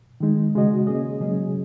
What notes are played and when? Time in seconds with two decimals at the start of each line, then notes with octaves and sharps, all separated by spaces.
0.20 D#3 G#3 D#4
0.55 C#3 G#3 F#4 D#5
0.87 A#3 C#4 G#4 D#5
1.20 C#3 F#3 C#4 G#4